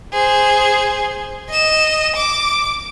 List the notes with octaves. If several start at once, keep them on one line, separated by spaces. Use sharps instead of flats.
G#4 C5
D#5 E7
D6